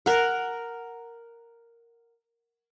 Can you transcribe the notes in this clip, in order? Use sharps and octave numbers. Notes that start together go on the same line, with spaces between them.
A#4 F#5